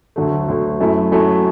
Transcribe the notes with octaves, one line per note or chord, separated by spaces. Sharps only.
D2 D3 F#3 A3
D2 D3 F#3 A3
F#2 F#3 A3 E4
F#2 F#3 A3 E4